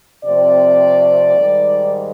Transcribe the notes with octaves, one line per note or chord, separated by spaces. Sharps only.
C3 F3 A3 C4 D5
G#2 D#3 G3